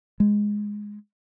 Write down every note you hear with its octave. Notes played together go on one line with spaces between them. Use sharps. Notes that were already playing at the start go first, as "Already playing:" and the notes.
G#3